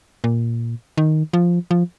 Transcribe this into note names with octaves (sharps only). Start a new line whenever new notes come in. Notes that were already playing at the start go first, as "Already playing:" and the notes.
A#2
D#3
F3
F3